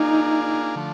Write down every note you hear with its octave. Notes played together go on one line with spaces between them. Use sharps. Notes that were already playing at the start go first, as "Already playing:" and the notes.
Already playing: A#3 D4 D#4 F4 G#4
D3 F3 A3